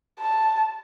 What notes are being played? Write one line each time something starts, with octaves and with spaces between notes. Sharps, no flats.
A5